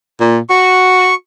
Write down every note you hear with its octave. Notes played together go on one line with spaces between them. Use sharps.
A#2
F#4 C#6